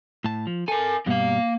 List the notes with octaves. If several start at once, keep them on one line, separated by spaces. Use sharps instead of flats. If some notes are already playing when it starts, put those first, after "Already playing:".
A2 A5
F3
A4 A#4 G#5
G2 B2 G3 A#3 F5